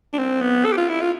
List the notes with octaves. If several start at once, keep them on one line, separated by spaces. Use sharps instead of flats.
D4
C4
B3
A4
G4
F4
E4
F4